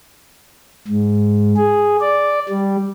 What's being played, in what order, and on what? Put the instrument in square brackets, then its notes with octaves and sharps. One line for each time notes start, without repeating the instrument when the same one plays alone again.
[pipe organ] G#2
G#4
D5
G3